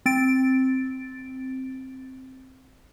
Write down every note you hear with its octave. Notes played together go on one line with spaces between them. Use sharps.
C4 A6 D7